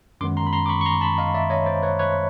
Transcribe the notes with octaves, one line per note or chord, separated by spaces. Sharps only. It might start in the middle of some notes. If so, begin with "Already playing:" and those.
F#2 D#3 G#3 B3 C6 D6
A#5 C6
B5
A#5 C6
D6
B5 C#6
C#6
A#5 C6
A5 B5
D#5 F5
D5 E5
C#5 D#5
C5 D5
B4 C#5
B4 C#5